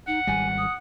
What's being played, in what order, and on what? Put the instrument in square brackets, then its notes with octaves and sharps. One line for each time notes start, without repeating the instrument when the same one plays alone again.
[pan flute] D#4 [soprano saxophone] F#5
[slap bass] G#1 G3 [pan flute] G#5
[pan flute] D#6